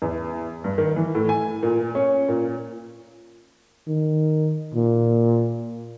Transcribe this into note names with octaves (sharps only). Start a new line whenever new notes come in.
E2
G2
D#3
E3
A2
G#5
A#2
C#4
A#2
D#3
A#2